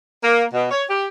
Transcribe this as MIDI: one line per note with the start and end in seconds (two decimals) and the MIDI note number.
0.24 0.44 58
0.54 0.68 47
0.71 0.84 73
0.90 1.06 67